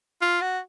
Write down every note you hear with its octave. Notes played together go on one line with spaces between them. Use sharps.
F4
F#4